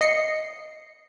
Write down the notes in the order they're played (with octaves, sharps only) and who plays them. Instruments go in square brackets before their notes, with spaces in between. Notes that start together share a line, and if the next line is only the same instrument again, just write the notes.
[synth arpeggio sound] D#5 C7 C#7